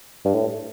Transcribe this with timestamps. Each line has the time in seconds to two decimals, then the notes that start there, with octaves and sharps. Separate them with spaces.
0.25 G2
0.34 A2